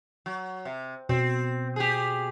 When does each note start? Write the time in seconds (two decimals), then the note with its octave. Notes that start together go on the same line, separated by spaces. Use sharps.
0.26 F#3
0.65 C3
1.09 B2 C4
1.76 G4 G#4